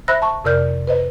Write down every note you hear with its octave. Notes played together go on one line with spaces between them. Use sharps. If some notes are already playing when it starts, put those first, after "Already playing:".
C5 E5 B5 E6 F#6 A#6
A5 C#6
F2 C3 A#4 D5 F6 G6
B4 C5 D#5